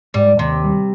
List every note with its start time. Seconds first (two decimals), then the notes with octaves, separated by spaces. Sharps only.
0.14 G#2 G3
0.39 D#2 C3
0.64 G3